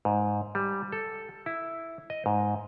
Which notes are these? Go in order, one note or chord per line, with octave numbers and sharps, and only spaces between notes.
G#2
G3
A4
E4
D#5
G#2